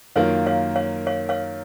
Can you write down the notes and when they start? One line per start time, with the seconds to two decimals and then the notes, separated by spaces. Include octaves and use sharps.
0.16 F#2 D#3 A#3 F4 A#4 C#5 F5
0.46 C#5 F5
0.76 C#5 F5
1.07 C#5 F5
1.29 C#5 F5